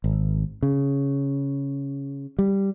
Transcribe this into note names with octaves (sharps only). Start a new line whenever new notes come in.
G#1
C#3
G3